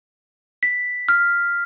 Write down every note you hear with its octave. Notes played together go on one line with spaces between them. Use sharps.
B6
F6